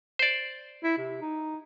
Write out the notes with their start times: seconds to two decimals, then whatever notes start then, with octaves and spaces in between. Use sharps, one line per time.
0.19 C5 D5
0.84 E4
0.98 C3
1.21 D#4